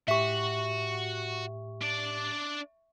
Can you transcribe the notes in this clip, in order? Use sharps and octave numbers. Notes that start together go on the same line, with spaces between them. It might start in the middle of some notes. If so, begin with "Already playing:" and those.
A2 F#4 G4 E5 C#6
D4 D5